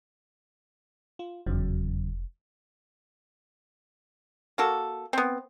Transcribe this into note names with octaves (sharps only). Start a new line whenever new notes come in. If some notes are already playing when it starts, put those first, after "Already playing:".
F4
F1 E2 C#3 F#3
A#3 F#4 A4
B3 C4